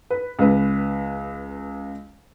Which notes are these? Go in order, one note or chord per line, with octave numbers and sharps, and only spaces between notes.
B4
C#2 B4